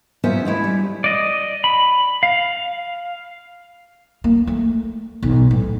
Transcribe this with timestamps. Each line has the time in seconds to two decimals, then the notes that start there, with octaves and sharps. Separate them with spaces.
0.24 B3 C#4 D#4 F4 C5 E5
0.45 G#3 A3 E4
0.64 G3
1.04 D5 D#5
1.64 B5
2.23 F5
4.24 A#3
4.47 A3
5.23 B1
5.51 A2